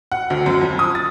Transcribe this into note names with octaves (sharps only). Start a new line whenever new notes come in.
F#5
D2
F#2
F2
D#6
A6